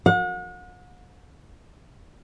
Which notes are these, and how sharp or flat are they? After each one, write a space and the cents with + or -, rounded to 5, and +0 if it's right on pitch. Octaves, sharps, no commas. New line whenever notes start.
F#5 -40